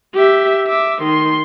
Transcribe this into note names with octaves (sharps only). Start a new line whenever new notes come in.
G4 E5
E5 D6
D#3 C6